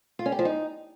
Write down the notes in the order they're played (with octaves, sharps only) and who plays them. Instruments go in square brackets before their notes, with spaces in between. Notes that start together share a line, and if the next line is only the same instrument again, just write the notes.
[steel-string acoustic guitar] F4
C#4
G4
F3
D#4